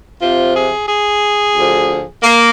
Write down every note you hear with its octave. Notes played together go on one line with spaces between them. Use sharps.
F2 C3 F3 F4
G#4
G#4
D2 D3 F3
A#3